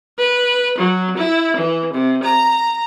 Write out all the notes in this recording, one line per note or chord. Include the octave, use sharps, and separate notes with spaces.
B4
F#3
E4
E3
C3
A#5